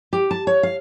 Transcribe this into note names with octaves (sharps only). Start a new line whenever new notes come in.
G4
A5
C#5
F5